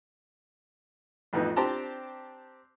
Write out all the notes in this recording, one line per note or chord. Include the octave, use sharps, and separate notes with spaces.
A1 F2 B3 D#4
C4 D4 G4 A5 A#5 C6